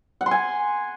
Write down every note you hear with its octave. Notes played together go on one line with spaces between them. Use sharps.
F#5
C6
G#5